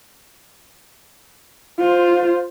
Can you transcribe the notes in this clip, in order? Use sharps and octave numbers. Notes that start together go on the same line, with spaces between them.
F4 C5